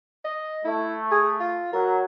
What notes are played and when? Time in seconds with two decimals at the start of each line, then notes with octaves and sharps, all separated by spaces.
0.25 D#5
0.65 A3 E4
1.11 G#4
1.40 F4
1.73 F#3 A#4